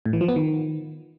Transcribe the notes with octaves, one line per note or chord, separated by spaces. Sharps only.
A2
E3
F3
B3
D#3